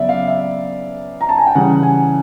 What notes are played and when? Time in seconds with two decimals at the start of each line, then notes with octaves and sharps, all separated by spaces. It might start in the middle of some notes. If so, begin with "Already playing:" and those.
Already playing: C#3 F#3 B3 D5 E5
0.09 F5
0.28 E5
1.21 A#5
1.29 A5
1.38 G#5
1.47 G5
1.55 C#3 E3 G3 F#5
1.83 G#5